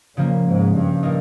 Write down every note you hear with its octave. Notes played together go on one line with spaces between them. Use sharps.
A#2 C#3 F3 A#3 C#4
G#2
G2
A#2 G3 A#3 D#4